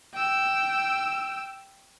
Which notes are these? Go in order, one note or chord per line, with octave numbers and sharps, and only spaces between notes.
G5 E6